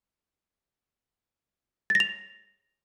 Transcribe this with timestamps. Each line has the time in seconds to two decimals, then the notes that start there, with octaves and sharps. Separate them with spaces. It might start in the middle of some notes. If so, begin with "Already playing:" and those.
1.90 A6
1.95 A#6
2.00 F7